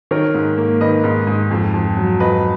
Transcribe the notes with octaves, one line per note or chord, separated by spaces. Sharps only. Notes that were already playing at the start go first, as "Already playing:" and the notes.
D#3 A#4 C#5
G#2
A#3
D#3 B4 D#5
G#2
G#2
F2
F2
F#3
F2 B4 D#5